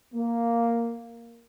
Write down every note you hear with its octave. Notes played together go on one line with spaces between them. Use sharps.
A#3